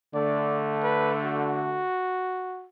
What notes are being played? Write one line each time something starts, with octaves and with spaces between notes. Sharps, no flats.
D3 A3 D5
B4
F#4